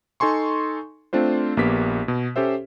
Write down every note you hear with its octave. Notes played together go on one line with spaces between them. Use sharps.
D#4 A4 G#5 C6 C#6
A3 C4 D4 F4 C5
A#1 A#3 B3 G4 B6
B2
C#4 G4 A4 C5 E5